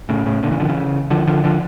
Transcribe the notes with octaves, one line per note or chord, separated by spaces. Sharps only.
A2 C#3
A2 C#3
A#2 D3
C#3 E3
D3 F3
C#3 E3
D3 F3
D3 F3
D3 F3